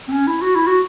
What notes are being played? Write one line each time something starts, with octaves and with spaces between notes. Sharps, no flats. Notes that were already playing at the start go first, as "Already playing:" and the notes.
C4
C#4
E4
F#4
E4
F#4